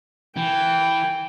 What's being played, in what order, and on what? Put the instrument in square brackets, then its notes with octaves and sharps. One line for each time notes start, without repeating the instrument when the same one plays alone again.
[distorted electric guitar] E3 [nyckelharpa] G5